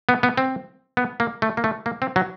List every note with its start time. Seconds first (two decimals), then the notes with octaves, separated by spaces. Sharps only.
0.09 B3
0.23 B3
0.38 C4
0.97 B3
1.20 A#3
1.42 A3
1.57 A#3
1.64 A3
1.86 A#3
2.02 C4
2.16 F#3